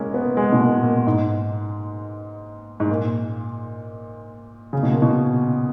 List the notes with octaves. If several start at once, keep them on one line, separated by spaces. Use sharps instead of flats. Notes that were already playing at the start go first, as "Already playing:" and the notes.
Already playing: G#3 A#3 C#4
B3
G#3
B2
A#2
A#2
G#2
G#2
A#2
C#3
B2
A#2
B2